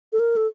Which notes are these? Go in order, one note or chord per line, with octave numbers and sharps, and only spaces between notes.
A4
A#4
A4